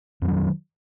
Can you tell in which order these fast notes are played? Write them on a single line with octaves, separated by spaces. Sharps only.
F2 F3 F#3 D#3